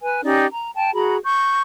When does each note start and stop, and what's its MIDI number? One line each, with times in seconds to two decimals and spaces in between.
0.01 0.20 71
0.01 0.20 80
0.24 0.46 61
0.24 0.46 63
0.24 0.46 67
0.24 0.46 74
0.52 0.69 82
0.75 0.93 79
0.75 0.93 81
0.93 1.17 66
0.93 1.17 68
0.93 1.17 82
0.93 1.17 83
1.24 1.60 85
1.24 1.60 91